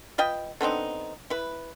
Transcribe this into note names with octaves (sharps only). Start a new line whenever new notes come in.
F4 B4 D#5 G5
D3 B3 C4 D#4
E4 B4